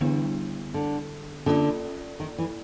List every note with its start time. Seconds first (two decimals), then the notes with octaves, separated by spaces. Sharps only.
0.01 D3 E3 G3 B3 D4
0.74 D3
1.46 D3 A#3 C#4 F4 A4 D5
2.20 D#3
2.38 E3